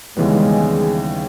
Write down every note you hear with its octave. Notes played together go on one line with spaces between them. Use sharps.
D#2 C#3 E3 G3 G#3 B3